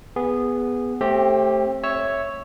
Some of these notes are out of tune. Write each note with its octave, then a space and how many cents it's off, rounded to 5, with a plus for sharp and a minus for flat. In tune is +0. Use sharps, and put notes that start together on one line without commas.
B3 +0 G#4 -15
A3 +0 C4 +30 G4 +0
C#5 +0 E5 +0 E6 +0